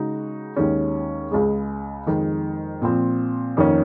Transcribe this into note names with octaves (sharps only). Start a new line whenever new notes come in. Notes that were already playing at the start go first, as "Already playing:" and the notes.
Already playing: C#3 G#3 D#4 F#4
D#2 D#3 G#3 C#4
C#2 C#3 G#3
F2 D#3 G#3
A#2 F3 C4
F2 D#3 A#3 C#4